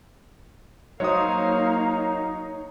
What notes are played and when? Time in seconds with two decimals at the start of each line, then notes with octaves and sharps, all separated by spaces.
1.00 F#3 A#3 D#4 C5 C#5 D#5 F5 D#6